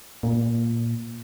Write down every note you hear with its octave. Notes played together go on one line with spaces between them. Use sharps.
A#2